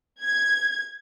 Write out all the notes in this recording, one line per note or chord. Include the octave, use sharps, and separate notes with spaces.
G#6